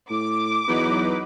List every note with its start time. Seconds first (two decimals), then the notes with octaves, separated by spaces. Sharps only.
0.10 A2 D6
0.68 E2 F#3 D#4 B4